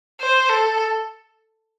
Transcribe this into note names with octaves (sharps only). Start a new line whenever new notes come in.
C5
A4